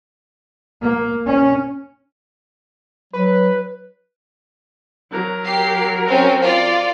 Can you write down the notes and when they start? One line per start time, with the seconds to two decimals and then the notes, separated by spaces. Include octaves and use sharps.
0.82 A#3
1.26 C#4
3.13 F#3 B4
5.12 F#3 A#4
5.45 G4 C7
6.07 C4 C#4
6.42 F4 D5